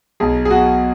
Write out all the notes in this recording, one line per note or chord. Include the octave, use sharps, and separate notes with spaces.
B1 G#4
G#4
B2 F#4